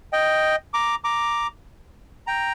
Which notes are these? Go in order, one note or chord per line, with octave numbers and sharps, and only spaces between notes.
D#5 G5
A#5 D6
A#5 D6
G5 A#5